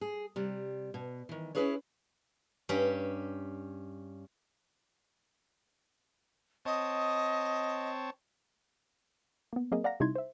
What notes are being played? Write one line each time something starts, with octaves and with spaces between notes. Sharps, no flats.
G#4
C3 G3
B2
D#3 E3
C#4 D4 E4 G#4 B4 C#5
G2 C#4 G4
C4 C#5 D#5 A5
A#3 B3
F#3 A#3 C4 G#4 A#4 D#5
D5 F5 F#5 A#5 A#6
C3 G3 D#4 E4 C6 G#6
C5 E5